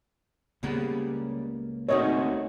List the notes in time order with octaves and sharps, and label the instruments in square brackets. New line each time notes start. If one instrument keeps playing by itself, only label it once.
[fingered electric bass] C#2 A#3 [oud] C#3 G3 B3
[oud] D#3 A3 D#4 [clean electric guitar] C4 F#4 G#4 [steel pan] C#5 D#5